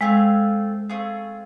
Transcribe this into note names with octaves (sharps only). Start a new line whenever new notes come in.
G#3 A3 C4 F4 G#4
A3 C4 F4 G#4